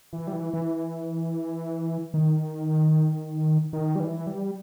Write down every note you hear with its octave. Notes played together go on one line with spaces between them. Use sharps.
E3
G3
E3
E3
D#3
D#3
G3
E3
G3